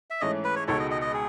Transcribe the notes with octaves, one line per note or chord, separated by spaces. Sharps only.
E5
G#2 E3 A3 C#4 D#5
B4
C#5
C#2 B2 G#3 D#4 A4 C#5
D#5
D#5
D#5
G#4